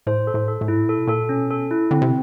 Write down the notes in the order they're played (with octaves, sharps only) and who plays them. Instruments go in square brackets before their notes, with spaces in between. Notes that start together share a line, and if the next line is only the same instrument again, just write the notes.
[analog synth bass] A2 [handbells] C5
[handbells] A4
[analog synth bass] A2
[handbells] A4
[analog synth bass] A2
[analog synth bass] G#2 [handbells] E4
[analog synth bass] A2
[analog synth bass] A#2 [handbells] A4
[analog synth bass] B2
[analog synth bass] A#2 [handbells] A4
[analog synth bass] B2 [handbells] C#4
[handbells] A4
E4
[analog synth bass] D3 [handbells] C4
[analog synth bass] C3